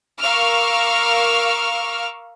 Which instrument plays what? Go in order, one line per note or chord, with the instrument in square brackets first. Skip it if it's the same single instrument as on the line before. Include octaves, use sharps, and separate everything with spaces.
[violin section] A#4 F5 C#6 D6 E6 F6